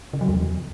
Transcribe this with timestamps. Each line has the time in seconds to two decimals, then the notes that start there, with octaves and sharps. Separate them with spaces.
0.13 C#3
0.21 F#3
0.28 E2